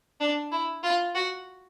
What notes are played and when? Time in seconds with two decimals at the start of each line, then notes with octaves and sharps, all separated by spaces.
0.20 D4
0.52 E4
0.83 F4
1.15 F#4